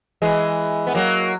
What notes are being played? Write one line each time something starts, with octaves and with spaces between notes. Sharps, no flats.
E3 G#3
B3
F#3 A#3